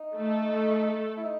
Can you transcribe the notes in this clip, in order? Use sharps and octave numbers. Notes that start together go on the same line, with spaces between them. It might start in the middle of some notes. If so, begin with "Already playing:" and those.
Already playing: D#4
A3 A4
E4
D#4